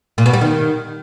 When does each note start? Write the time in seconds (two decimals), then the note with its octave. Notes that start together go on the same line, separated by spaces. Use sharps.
0.18 A#2
0.26 B2
0.33 G3
0.41 D#3